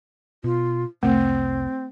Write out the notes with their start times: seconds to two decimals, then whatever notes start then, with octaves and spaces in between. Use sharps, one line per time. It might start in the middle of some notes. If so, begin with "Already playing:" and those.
0.44 B2 F4
1.03 F1 C2 A3 C4